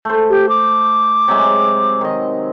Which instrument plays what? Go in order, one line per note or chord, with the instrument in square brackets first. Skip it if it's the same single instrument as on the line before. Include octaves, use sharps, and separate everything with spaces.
[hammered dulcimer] A3 C5
[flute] G4
D6
[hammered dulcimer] C3 F#3 G#3
D#3 D#5